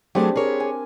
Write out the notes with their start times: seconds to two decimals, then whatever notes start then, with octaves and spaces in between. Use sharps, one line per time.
0.15 F#3 A3 C4 D4 G4 G#4
0.36 G#4 A#4 C#5
0.60 G#5